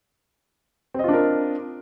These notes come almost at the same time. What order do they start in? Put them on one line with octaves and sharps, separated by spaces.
C4 D#5 F4 D4 A#4